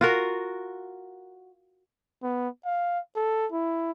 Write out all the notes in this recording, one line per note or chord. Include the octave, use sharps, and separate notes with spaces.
F4 F#4 A#4
B3
F5
A4
E4